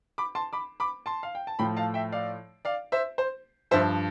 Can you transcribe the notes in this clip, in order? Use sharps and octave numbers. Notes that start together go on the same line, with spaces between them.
B5 D6
A5 C6
B5 D6
B5 D6
A5 C6
F5
G5
A5
A2 F3 G5 B5
F5 A5
E5 G5
D5 F5
D5 F5
C5 E5
C5
G2 F3 C5 E5